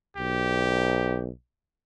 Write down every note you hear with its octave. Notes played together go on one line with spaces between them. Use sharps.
B1 G4